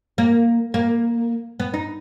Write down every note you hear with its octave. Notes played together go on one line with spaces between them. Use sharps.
A#3
A#3
B3
D#4